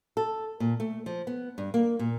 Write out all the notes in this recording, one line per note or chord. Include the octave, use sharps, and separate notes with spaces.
A4
A#2
A3
F3
B3
G2
A#3
A#2